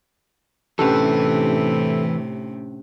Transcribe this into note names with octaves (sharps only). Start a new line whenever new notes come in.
A2 C3 E3 C#4 D4 G4 A4 B4